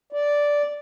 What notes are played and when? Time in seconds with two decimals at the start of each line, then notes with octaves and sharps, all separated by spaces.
0.12 D5